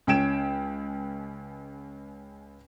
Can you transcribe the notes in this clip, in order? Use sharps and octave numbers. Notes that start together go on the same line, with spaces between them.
C#2 C#4 G5 G#6 D7 E7